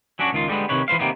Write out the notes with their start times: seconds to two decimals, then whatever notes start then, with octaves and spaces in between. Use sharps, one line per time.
0.19 F#3 C#4 D4 F#4
0.33 C#2 D#3 F4
0.48 D3 G3 G#3 B3
0.69 C3 D#3 B4 C#5
0.88 E3 B4 C5 F5
0.99 C3 D#3 A#3 B3